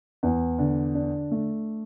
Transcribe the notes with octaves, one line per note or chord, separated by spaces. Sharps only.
E2
D3
D4
A3